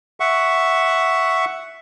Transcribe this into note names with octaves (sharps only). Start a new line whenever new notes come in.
E5 F#5 C#6